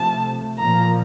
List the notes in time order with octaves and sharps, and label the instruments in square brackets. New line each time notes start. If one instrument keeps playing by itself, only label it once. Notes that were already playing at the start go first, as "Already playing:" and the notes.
Already playing: [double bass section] C3 F3 A3 [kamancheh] A5
[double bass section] A#2 F3 A#3 [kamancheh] A#5